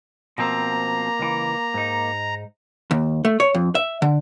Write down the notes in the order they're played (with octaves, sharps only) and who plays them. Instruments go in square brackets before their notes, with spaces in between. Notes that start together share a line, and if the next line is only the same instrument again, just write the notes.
[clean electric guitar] B2 F3 C4 [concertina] A#3 [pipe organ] A#5
[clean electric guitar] C#2 E3
G#2 D#4
[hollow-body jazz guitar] D#2
A3
C#5
F2
E5
D3